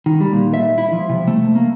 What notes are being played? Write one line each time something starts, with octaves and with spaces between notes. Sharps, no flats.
D#3
G3
A#2
E5
E4
F3
C3
A3
A#3